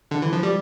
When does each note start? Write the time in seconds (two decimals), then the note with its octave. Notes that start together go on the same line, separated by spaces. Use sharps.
0.11 D3
0.22 E3
0.33 F3
0.43 G3